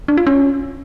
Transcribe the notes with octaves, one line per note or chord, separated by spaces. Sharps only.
D4
F4
C#4